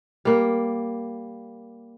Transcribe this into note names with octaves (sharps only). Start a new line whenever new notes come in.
G3 A#3